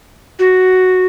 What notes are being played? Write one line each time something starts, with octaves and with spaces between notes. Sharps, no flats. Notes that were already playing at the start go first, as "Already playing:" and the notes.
F#4